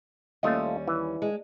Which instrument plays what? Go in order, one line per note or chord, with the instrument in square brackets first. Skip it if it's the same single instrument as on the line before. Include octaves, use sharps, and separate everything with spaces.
[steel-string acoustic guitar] D#2 G3 C#4 [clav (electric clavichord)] A3 F4 D#5
[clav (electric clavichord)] E3
[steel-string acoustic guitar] G#3